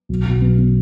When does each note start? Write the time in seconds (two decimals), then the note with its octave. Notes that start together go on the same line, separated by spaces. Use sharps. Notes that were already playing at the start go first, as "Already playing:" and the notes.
0.09 B1
0.26 B1
0.42 B2
0.58 B2